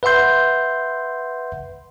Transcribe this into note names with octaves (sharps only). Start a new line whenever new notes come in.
B4 E5 F#5 C6 G6